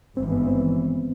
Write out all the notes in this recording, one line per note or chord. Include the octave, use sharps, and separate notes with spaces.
G#1 G2 E3 C4
B3
C4